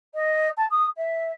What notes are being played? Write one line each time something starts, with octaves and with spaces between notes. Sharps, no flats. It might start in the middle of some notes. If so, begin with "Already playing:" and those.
D#5
A5
D#6
E5